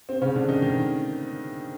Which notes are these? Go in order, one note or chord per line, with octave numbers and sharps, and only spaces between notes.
C4
C#3 C#4
D3 D4
D#3 D#4
D#3 D#4